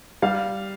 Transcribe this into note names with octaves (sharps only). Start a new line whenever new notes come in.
G3 F5